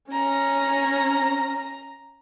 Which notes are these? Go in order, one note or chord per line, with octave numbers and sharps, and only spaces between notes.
C#4 A#5